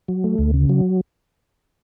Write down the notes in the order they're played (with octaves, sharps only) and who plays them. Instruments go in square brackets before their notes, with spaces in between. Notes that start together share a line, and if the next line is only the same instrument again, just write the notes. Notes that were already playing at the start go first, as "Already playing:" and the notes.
[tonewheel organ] F#3
A3
D2
C#3
F#3